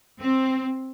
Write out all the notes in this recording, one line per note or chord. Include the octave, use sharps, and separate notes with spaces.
C4